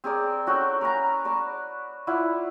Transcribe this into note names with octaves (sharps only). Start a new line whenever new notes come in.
C4 G#4 A#4 D5
C#4 F#4 A4 G5
A#4 B4 G#5 A#5
B4 D5 A5
E4 F4 D5 F#5